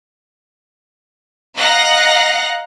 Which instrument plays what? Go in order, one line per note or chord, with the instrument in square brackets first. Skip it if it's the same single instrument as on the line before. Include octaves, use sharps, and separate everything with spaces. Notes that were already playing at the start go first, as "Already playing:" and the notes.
[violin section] D#5 F5 F#5 A#5 F#6 A#6